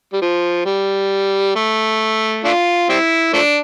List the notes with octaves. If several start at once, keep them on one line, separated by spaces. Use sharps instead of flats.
G3
F3
G3
A3
A3 D4 F4
G3 C4 E4
F3 A3 D4